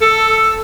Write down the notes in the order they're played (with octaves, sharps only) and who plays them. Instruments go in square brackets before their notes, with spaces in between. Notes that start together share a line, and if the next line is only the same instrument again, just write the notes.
[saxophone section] A4